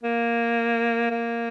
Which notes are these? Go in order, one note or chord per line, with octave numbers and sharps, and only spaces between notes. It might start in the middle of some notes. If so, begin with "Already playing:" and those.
A#3
A#3